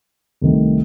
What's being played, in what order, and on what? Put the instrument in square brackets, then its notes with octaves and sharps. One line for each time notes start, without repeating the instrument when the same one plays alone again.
[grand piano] C2 C3 D#3 A3